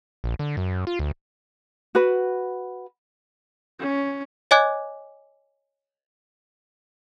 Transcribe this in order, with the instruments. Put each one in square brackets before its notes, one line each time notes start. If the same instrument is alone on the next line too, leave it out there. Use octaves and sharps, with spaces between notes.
[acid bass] A#1
D3
F#2
F4
D2
[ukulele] F#4 B4
[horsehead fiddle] C#4
[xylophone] C#5 D#5 G#5 D6 F#6 G#6